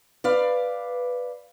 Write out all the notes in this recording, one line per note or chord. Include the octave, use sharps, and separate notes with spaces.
B4 D5 F5